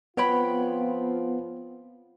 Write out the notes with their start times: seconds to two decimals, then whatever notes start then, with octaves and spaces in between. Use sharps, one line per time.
0.17 F3 B3 C4 F4 C#5 G5 B5